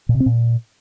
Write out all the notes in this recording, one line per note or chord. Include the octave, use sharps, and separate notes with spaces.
A#2
C3
C4
A#2